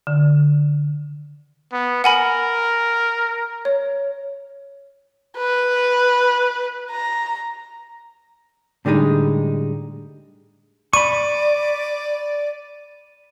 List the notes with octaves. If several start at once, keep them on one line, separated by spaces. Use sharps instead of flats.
D3
B3
A#4 F#5 G#5 B5
C#5
B4
A#5
A2 D3 G3 G#3 D#4
D5 B5 C#6 D#7